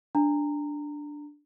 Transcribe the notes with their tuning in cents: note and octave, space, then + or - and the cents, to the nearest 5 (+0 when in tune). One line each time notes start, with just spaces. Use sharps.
D4 +0 A#5 -20